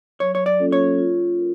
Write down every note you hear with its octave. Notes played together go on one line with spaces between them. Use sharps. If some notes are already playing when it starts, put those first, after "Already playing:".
F#3 C#5
C#5
D5
A#3 C#4 F4 A4
C#5
F4
A#4